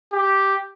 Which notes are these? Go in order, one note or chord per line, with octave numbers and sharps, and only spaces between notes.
G4